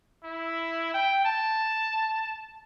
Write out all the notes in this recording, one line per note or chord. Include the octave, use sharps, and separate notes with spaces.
E4
G5
A5